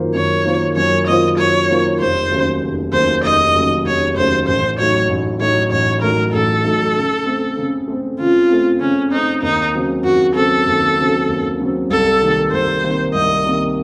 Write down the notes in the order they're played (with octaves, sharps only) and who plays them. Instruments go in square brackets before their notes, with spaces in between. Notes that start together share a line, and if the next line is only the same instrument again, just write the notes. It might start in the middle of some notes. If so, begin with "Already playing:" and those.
Already playing: [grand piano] F#2 D#3 A#3 F4 C5
[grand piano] F#2 [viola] C#5
[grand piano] D#3 A#3 F4 C5
[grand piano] F#2 [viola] C#5
[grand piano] D#3 A#3 F4 C5 [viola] D#5
[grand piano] F#2 [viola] C#5
[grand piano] D#3 A#3 F4 C5
[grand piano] F1 [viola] C5
[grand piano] D#2 C#3 F#3 A3
F1
[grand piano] D#2 C#3 F#3 A3 [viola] C5
[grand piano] F1 [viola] D#5
[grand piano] D#2 C#3 F#3 A3
[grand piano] F1 [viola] C#5
[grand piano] D#2 C#3 F#3 A3 [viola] C5
[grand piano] A1 [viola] C5
[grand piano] A2 F#3 A3 D#4 [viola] C#5
[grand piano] A1
[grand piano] A2 F#3 A3 D#4 [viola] C#5
[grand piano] A1 [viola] C#5
[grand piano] A2 F#3 A3 D#4 [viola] A#4
[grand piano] A1 [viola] A4
[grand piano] A2 F#3 A3 D#4
C#3
A3 C4
C#3
A3 C4
[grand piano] C#3 [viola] F4
[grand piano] A3 C4
[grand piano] C#3 [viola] C#4
[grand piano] A3 C4 [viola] D#4
[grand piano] D#2 [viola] D#4
[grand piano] C#3 F#3 C4
[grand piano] D#2 [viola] F#4
[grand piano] C#3 F#3 C4 [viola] A4
[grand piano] D#2
C#3 F#3 C4
D#2
C#3 F#3 C4
[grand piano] C2 [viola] A4
[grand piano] C3 D#3 A#3
[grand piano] C2 [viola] C5
[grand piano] C3 D#3 A#3
[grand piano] C2 [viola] D#5
[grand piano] C3 D#3 A#3